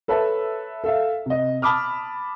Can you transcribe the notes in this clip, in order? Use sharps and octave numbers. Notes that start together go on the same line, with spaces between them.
A4 B4 C#5 E5 A5
A4 E5 F5
C3 D#5
A5 B5 D6 D#6 F6